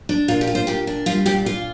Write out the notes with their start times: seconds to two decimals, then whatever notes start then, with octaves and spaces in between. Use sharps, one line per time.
0.09 D4
0.28 A#2 F4
0.41 G4
0.47 F4
0.55 C5
0.67 A#2 G4
0.87 D4
1.06 G3 F4
1.26 A#2 G4
1.46 F4 F5